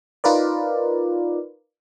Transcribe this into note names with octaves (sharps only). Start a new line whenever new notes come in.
D#4 F4 A#4 B4 D5